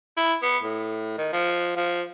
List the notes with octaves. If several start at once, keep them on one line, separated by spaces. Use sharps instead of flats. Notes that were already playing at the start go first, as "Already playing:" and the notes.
E4
B3
A2
D#3
F3
F3